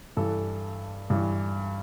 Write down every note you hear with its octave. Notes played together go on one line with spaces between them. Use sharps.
G2 E3 A4
G2 E3